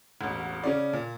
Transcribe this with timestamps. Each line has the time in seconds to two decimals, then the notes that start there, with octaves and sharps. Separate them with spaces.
0.21 E1 A1
0.64 C#3 C#4 D5
0.93 A#2